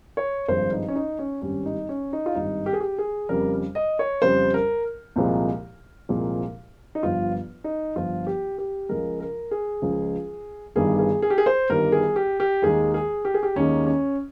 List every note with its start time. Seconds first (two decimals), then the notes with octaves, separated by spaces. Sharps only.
0.17 C#5
0.48 G#1 G2 F3 G#3 C5
0.72 D#4
0.88 C#4
0.95 D#4
1.19 C#4
1.42 G#1 G2 G3 C#4
1.66 D#4
1.89 C#4
2.13 D#4
2.26 F4
2.35 G#1 G2 G3 D#4
2.66 G4
2.73 G#4
2.80 G4
2.98 G#4
3.29 F2 C#3 G3 A#4
3.75 D#5
3.99 C#5
4.22 F2 C#3 G3 C5
4.54 A#4
5.16 C2 A#2 F3 G#3
6.09 C2 A#2 F3 G#3
6.95 D#4
7.03 G1 G2 F3 F4
7.64 D#4
7.96 G1 G2 F3 F4
8.27 G4
8.58 G4
8.89 C#2 C#3 F3 G#3 A#4
9.20 A#4
9.51 G#4
9.82 C#2 C#3 F3 G#3
10.76 G1 G2 D#3 G3 G#4
10.99 G#4
11.22 G#4
11.30 G4
11.38 G#4
11.46 C5
11.70 G1 G2 D#3 G3 A#4
11.92 G#4
12.16 G4
12.40 G4
12.62 D#2 D#3 G#3 G#4
12.94 G#4
13.25 G4
13.34 G#4
13.43 G4
13.56 D#2 D#3 G#3 C#4
13.87 C#4